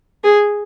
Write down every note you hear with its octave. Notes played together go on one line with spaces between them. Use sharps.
G#4